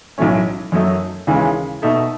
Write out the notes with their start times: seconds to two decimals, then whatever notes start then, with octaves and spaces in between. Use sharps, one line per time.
0.18 B1 A2 F#3 A3 C#4
0.72 F#2 D#3 F#3 A3 D#4
1.27 D#2 C#3 E3 G#3 C#4
1.82 B2 A3 D#4 A4 E5